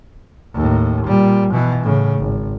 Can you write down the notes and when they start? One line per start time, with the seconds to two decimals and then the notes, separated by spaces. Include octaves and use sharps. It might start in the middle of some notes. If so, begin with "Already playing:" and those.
0.54 D#2 A2
1.06 A#2 G3
1.51 B2 E3
1.84 A2 C#3
2.19 G#1